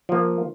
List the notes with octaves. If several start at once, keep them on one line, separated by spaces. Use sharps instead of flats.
F3 A#3